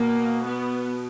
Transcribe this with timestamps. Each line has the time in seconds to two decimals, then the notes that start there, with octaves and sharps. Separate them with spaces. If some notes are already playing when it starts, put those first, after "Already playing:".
Already playing: B2 A#3
0.45 B3